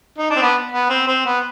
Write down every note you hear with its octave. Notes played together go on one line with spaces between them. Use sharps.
D#4
D4
C4
B3
B3
C4
C4
B3